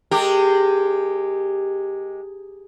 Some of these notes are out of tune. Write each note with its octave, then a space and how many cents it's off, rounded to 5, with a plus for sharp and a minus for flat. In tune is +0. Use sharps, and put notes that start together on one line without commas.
G#3 +0 G4 +0 A#4 -40